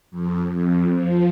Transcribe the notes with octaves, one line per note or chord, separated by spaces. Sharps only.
F2
F2
F3